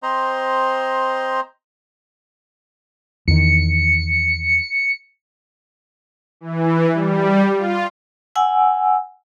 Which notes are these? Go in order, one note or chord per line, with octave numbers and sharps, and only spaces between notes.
C4 C5 D#5 A#5 C6
E2 D#3 C#7
E3
G3
F4
F#5 G#5 E6